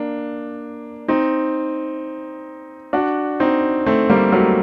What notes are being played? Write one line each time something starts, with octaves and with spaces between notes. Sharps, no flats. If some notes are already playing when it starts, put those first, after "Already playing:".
Already playing: A#3 D4
C4 D#4
D4 F#4
C4 D#4
A3 C4
G3 A#3
F#3 A3